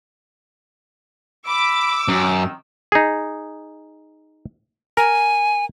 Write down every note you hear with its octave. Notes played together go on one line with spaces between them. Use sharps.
B5 D6 E6
F#2 D#3
D#4 G#4
A#4 G#5